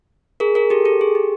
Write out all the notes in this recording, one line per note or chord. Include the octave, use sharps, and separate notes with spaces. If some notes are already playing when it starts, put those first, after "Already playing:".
G#4 A#4
G#4 A#4
G4 A4
G4 A4
G#4
G4